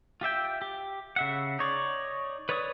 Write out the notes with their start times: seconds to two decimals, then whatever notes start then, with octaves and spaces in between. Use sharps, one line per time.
0.21 F4 G4 E5 G5
0.62 G4
1.16 C#3 E5 F#5
1.59 D#4 C#5 D5
2.49 B4 C#5 D5 C#6 D#6